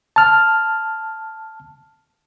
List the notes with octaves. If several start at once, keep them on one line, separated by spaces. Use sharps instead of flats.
A5 F6